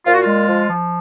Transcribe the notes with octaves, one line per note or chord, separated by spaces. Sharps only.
A#2 F4
F#4
G#3 F4
F3
F3